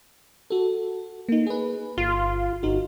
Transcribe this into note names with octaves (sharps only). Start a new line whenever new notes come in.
F#4 A4
A#3 D#4
G#4 B4
G1 F4
G1 D#4 F#4